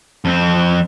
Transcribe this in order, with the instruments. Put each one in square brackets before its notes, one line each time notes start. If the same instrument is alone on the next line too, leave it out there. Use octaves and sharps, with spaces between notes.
[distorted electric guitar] F2 C4